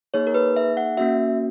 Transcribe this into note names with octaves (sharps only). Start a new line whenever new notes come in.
A#3 D#4 G#4 C#5
A#4
B4
E5
F#5
A#3 C#4 F#4 E5